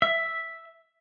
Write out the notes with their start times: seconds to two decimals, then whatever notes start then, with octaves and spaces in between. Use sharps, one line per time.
0.02 E5